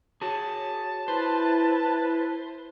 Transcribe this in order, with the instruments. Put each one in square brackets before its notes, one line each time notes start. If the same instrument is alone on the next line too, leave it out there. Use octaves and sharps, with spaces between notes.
[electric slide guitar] F#4 G#4 [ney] C#5 [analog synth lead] A5
[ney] E4 [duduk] B4 [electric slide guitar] C5